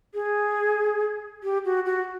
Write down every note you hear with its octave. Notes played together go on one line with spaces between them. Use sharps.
G#4
G4
F#4
F#4